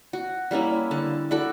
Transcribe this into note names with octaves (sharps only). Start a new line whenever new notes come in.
F#4
G3 A#3 C#4 E4
D3 A5
E4 F#4 A4 D5